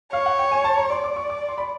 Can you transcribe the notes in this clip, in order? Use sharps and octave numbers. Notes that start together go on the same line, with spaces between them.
C#5 F5
F#5
G5
G#5
A5
A#5
D5 C6
D6
C#6
D6
C6
B5